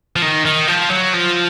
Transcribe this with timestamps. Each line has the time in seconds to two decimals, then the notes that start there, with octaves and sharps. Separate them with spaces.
0.16 F3
0.22 D#3
0.45 D#3
0.68 F3
0.91 F#3
1.14 F3